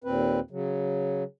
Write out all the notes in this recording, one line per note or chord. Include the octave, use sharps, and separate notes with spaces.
D#2 A#2 C4 B4
C#3 F#3